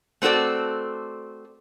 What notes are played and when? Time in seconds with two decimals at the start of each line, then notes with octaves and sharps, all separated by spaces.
0.22 A3 C4 F#4 A4 D5